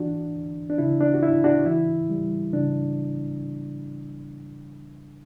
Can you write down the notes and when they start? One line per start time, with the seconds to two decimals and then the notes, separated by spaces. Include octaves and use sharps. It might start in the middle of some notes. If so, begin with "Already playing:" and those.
Already playing: E3 D4 F#4
0.36 D2
0.70 D4
0.78 C#3 E4
1.01 D4
1.14 F#4
1.22 D2 E4
1.44 D4 F#4
1.66 E3 E4
2.10 G3
2.53 C#3 D4